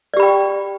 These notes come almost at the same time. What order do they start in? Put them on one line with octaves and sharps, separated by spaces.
D5 G4 B5 G5